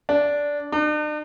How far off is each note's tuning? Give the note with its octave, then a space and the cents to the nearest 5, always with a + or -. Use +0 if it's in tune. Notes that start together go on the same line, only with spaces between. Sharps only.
D4 -10
D4 +45